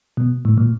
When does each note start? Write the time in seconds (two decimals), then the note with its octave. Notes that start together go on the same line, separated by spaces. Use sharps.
0.17 B2
0.45 A2
0.58 A#2